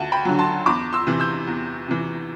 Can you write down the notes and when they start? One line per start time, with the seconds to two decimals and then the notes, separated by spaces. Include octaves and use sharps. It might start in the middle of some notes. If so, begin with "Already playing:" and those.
Already playing: D2 F#5 A5
0.12 G5 B5
0.25 D3 F#3
0.39 A5 C6
0.66 E2 B5 D6
0.93 C6 E6
1.07 C3 E3
1.20 E6 G6
1.47 E2
1.88 C3 E3